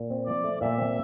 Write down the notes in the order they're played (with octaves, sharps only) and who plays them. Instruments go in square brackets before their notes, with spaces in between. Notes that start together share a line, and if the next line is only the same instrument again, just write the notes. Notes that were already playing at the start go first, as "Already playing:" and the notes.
Already playing: [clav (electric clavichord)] A#2
C4
[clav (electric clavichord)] F3 [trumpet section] D5
[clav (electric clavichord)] A3
[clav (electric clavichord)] A#2 [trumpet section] E5
[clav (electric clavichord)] C4